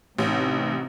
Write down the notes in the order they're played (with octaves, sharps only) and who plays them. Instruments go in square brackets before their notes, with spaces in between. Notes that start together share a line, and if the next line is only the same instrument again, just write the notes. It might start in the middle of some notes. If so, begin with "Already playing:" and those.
[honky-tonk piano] A1 [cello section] C3 D#4 F#4